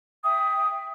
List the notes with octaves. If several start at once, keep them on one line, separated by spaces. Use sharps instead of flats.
E5 G5 D#6